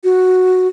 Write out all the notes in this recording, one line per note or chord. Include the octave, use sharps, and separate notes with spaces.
F#4